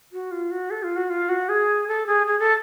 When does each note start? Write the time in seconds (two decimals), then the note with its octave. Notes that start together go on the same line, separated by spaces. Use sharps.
0.13 F#4
0.32 F4
0.51 F#4
0.70 A4
0.83 F4
0.96 F#4
1.10 F4
1.29 F#4
1.49 G#4
1.88 A4
2.07 G#4
2.27 G#4
2.39 A4